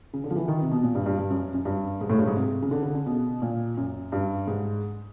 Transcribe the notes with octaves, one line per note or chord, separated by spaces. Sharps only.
C#3
D3
F3
E3
D#3
C3
B2
A#2
G2
G2
G2
F#2
F#2
G2
G#2
A2
G2
G#2
C3
C#3
D3
D3
C#3
B2
A#2
F#2
G2
G#2